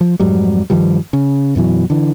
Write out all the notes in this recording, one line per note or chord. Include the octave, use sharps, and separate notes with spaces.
F3
F2 G#2 F#3 G3
G2 D#3 F3 G3
C#3
F#2 B2 E3 F#3
D3 E3